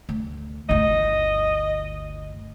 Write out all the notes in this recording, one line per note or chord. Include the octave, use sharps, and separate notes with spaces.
D2
G1 D2 D#5